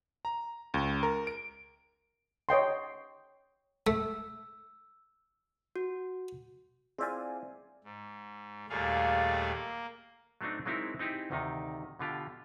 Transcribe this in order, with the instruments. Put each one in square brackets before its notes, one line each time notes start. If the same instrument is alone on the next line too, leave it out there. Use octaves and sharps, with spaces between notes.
[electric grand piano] A#5
C#2
A#4
D7
[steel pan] C#5 D#5 G5 C6
[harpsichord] A3 [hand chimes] E6
[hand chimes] F#4
[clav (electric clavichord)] C4 E4 F4 [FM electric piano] G#4 D5 G#5
[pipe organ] G#2
D#2 A#2 G3 A3 G#4 F5
A#3
[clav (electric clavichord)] F#3 A3 C4 D4 D#4
F#3 G#3 C4 D#4 E4 A#4
C4 D#4 E4 G4 G#4
D2 C3 D#3 D#4
B2 D3 F4 G4